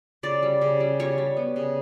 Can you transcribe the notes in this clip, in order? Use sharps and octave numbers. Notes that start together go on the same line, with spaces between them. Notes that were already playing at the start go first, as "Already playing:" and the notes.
C#3 D5
G3
C#3
G3
G3 C#5
G3
B3
C#3